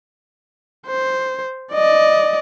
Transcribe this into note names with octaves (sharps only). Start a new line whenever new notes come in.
C5
D5 D#5